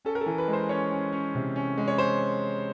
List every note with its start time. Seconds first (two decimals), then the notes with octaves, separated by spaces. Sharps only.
0.05 C#4 A4
0.15 A#4
0.21 A4
0.26 E3
0.38 B4
0.48 G#3
0.53 C5
0.69 C#4 C#5
0.92 C#4
1.12 C#4
1.35 C3
1.56 C#4
1.78 G#3
1.88 C#5
1.98 C5